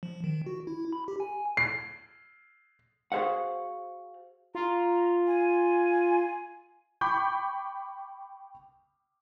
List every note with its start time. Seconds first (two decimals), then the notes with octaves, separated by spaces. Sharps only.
0.03 F3
0.24 D#3
0.46 F#4
0.67 E4
0.93 B5
1.08 G4
1.20 G#5
1.57 C7
3.12 F#4 G#4 C5 F5 F#5
4.55 F4 A#5
5.27 G#5
7.01 G5 B5 C#6 D6 G6